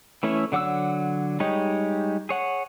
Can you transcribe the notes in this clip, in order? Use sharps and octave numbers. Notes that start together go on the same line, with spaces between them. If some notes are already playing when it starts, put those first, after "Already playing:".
E3 A3 C#4 E4 C#5
D3 F#3 F#5 D6 E6
G3 G#3 D#4 G4 C#5
G#4 C#5 F#5